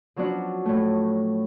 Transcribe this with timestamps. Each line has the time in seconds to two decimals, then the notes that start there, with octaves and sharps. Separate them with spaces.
0.16 F3 F#3 B3 C#4 D4
0.65 A2 A3